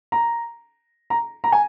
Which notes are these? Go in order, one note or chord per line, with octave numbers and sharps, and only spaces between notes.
A#5
A#5
A#5
G#5